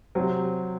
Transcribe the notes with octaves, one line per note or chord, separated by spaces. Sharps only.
C3 F#3 C4